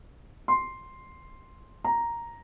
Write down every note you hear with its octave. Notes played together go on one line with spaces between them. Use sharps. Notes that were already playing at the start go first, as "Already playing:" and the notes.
C6
A#5